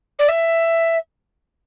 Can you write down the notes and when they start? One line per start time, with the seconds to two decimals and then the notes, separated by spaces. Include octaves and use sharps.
0.18 D5
0.28 E5